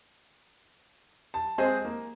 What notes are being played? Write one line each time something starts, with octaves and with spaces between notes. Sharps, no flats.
A5
G#3 C4 G#4 C5 D#5
A#3